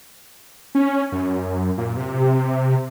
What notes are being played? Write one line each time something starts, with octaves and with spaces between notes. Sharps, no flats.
C#4
F#2
A#2
C3